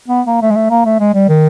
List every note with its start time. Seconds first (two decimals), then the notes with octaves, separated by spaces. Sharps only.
0.08 B3
0.27 A#3
0.42 A3
0.51 G#3
0.56 A3
0.70 A#3
0.85 A3
1.00 G#3
1.14 G3
1.29 D#3